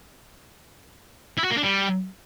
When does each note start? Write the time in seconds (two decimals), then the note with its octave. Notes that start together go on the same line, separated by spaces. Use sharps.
1.38 E4
1.44 F#4
1.50 A#3
1.57 D4
1.63 G3